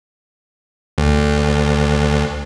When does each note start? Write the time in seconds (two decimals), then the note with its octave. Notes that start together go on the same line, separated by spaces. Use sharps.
0.98 D2